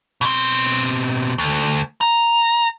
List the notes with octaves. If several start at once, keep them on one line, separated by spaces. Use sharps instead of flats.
B2 C4
D2
A#5